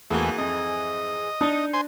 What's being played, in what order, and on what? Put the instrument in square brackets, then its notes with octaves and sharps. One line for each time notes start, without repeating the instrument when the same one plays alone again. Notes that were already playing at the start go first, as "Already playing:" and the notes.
[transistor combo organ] E2 A3 [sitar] G#2 E3 [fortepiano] A#3 F#4 G#4
[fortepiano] F2 [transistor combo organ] D#5
[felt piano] D4 [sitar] D#4 [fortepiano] D#6
[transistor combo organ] C5 G#5 C6